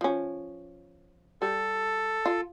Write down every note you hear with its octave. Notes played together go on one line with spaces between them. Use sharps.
F3 C#4
G3 A4
F4